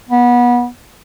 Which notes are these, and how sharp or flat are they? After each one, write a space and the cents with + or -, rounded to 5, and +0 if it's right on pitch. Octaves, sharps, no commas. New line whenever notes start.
B3 -25